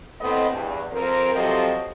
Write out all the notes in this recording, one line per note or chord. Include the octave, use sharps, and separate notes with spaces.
A2 B3 C4 A4 D#5
E2 G2
F2 A#4 C5
C3 F3 F#3 G4 A4 D#5